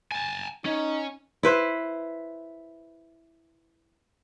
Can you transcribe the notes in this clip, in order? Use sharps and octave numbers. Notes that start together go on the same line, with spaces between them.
G#5 A5
C#4 D#4
E4 B4 C5